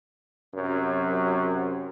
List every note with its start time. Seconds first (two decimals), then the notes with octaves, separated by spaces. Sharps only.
0.55 F#2 C3 F#3